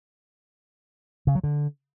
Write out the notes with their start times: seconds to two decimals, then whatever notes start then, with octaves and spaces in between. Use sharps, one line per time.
1.27 C#3
1.35 F#3
1.44 D3